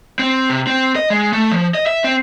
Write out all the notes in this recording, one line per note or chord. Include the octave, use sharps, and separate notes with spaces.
C4
C3
C4
D#5
G#3
A3
F3
D#5
E5
C4